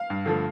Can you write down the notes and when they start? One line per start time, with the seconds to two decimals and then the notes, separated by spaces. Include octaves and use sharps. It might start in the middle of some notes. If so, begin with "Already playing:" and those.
Already playing: F5
0.10 G2
0.26 D3 F3 A3